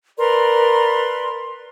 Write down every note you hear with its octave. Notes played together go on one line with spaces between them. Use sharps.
A#4 B4 D5 C6